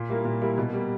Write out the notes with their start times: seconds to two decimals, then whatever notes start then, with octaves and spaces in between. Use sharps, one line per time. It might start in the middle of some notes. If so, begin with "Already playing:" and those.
Already playing: A#2
0.09 G3 A#3 E4 A#4
0.25 A#2
0.41 G3 A#3 E4 A#4
0.58 B2
0.73 G3 A#3